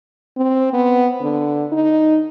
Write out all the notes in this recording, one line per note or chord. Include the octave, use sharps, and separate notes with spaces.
C4
B3
D3
D#4